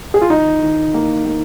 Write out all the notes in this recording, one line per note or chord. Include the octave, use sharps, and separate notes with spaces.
G#4
F4
D#3 D#4
D#3
A#3
A#3